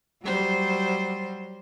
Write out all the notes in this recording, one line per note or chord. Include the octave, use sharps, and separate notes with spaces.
F#3 G3 C5